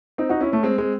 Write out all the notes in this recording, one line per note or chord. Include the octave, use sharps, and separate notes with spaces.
C4 D#4
D#4 F#4
C#4 E4
A3 C#4
G#3 C4
G#3 C4